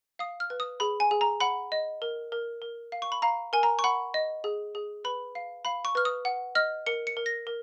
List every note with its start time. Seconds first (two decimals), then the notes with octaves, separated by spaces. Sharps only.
0.19 F5 D#6
0.40 F6
0.50 B4
0.60 D#6
0.80 G#4 B5
1.00 G#5
1.11 G#4
1.21 A#5
1.40 F#5 B5
1.72 D#5
2.02 A#4
2.32 A#4
2.62 A#4
2.92 F5
3.02 C#6
3.12 B5
3.22 F5 A#5
3.53 A#4 G#5
3.63 A#5
3.79 C#6
3.84 F#5 B5
4.14 D#5
4.44 G#4
4.75 G#4
5.04 B4 B5
5.35 F5
5.65 F5 B5
5.85 C#6
5.95 B4 F6
6.05 D#6
6.25 F#5
6.55 D#5 F6
6.86 A#4 C#7
7.07 C#7
7.17 A#4
7.26 A#6
7.47 A#4